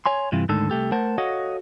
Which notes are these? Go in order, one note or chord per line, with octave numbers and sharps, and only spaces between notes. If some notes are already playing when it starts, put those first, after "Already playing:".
C#5 G#5 C6
G2 C3 E3 F4
D2 G#2 D3 D#3 A4
C2 A3 G4 A4
A3 A#4 C5 F#5 A5
F#4 A4 C#5 D#5 F5 F#5